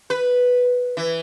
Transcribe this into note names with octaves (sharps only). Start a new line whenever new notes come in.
B4
E3